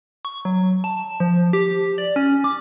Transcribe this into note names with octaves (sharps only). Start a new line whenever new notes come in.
C#6
F#3
A5
F3
G4
D5
C#4
D6